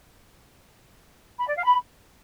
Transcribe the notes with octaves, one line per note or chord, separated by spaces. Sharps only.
B5
D5
F5
B5